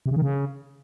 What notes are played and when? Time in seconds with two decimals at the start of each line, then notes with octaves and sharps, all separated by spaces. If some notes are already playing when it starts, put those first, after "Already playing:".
0.06 C3
0.11 C#3
0.17 D#3
0.22 C#3